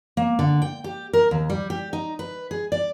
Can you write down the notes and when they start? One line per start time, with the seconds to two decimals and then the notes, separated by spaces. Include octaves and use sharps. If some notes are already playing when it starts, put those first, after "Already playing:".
0.17 A#3
0.39 D3
0.62 G5
0.84 G4
1.13 A#4
1.31 D#2
1.50 G3
1.70 G4
1.93 D#4
2.19 B4
2.51 G#4
2.72 D5